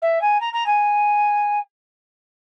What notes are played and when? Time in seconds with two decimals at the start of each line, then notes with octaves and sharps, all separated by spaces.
0.02 E5
0.21 G#5
0.40 A#5
0.53 A#5
0.66 G#5